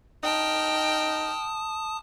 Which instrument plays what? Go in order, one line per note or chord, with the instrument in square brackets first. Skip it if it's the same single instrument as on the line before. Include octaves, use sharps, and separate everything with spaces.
[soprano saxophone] D#4 [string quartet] G5 F6 [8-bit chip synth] A5 D#6